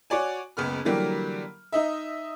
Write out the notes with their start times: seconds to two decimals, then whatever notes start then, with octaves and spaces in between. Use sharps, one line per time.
0.10 F#4 C#5 D5 G#5
0.57 F#1 C#2 B3 F6
0.85 D3 E3 F#3 G3 A#3 G4
1.72 D#4 D#5 E5